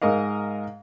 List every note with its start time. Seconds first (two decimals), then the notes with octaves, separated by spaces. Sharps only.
0.02 G#2 A#4 D#5 F5